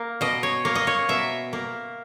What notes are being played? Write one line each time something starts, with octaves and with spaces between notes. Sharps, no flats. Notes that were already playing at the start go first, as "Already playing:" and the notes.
Already playing: A#3
B2 D#5
C#5
A#3
D#5
C#5
B2 E5
A#3